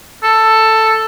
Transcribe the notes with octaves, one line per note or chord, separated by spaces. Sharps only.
A4